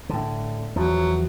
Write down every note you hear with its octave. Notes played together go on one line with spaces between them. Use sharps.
A2 D3
E2 F3 F#3